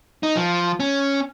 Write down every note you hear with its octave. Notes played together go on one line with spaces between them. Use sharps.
D#4
F3
C#4